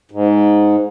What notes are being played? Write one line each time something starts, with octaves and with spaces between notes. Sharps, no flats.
G#2